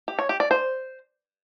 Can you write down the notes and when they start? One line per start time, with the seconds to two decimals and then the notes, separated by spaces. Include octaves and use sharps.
0.08 G4
0.19 C#5
0.29 G4
0.40 D5
0.51 C5